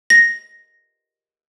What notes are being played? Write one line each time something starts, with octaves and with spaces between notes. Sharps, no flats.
A#6